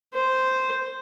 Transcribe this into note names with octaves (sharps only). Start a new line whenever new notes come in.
C5